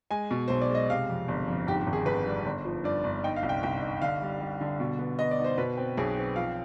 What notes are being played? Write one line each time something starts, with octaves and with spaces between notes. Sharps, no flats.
G#3 G#5
B2
B1 C5
D5
G#3
D#5
C3 F5
F2
G1
F2
G#2 G4
G4
G#1
G#4
G#1 B4
G3
G1
F3
G2 D5
G1
D#4 G5
F5
C2
G5
C2 G5
D#4
D3 F5
G3
G3
D3
B2
B3
B3 D#5
D5
D#4
C5
B2 B4
C4
B1 G#4
C4
F3 F5